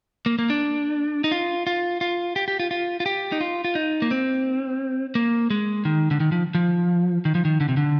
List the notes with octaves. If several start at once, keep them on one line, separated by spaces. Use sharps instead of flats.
A#3
A#3
D4
D#4
F4
F4
F4
G4
G4
F4
F4
F4
G4
D#4
F4
F4
D#4
A#3
C4
A#3
G#3
D#3
D3
D#3
F3
F3
D#3
F3
D#3
D3
C3
D3